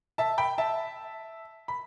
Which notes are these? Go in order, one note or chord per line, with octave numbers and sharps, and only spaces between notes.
E5 A5
G5 B5
E5 A5
B5